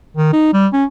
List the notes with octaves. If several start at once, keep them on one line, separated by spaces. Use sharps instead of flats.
D#3
D#4
G3
C#4